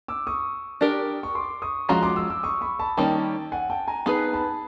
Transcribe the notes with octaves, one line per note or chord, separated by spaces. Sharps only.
D6 E6
C#6 D#6
D4 G4 A#4
C#6
C6 D6
C#6 D#6
F3 G#3 C#4 F#4 A#5 C6
C6 D6
D6 E6
D6 E6
C#6 D#6
B5 C#6
A5 B5
D#3 G3 A#3 C#4 G5 A5
F#5 G#5
G5 A5
G#5 A#5
B3 D#4 G#4 B4 A5 B5
A5 B5